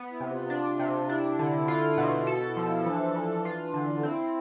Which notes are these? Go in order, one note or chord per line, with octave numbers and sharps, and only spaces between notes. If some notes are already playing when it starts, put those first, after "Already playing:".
Already playing: B3
E4
C3
F4
D4
C3
D4 E4
D3
F4
B2
A4
E4
F3
E4
E3 D4
E3
F4
D3
C4 E4